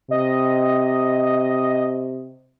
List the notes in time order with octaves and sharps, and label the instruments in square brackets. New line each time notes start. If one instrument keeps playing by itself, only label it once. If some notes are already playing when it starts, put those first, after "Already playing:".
[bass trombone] C3 [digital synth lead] D#5